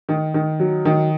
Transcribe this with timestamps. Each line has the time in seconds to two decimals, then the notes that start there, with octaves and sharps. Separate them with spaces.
0.09 D#3
0.34 D#3
0.60 F#3
0.85 D#3